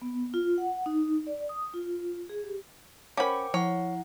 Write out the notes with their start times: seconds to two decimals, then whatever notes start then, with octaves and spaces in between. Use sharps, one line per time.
0.02 B3
0.34 F4
0.58 F#5
0.86 D#4
1.27 D5
1.49 D#6
1.74 F4
2.29 G#4
2.44 G4
3.17 C#4 A#4 C5 F#5 G5 B5 D6
3.54 F3 E4 C#5 F#5